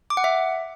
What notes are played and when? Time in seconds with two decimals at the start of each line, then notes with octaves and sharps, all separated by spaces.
0.10 D6
0.17 F#5
0.24 E5